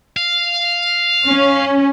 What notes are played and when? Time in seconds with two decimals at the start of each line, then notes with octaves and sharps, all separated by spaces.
0.17 F5
1.26 C#4